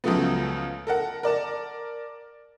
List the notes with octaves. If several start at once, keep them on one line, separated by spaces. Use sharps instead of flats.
C#2 C#3 F3 F#3 A3 B3
A4 A#4 F#5
A#4 D5 A5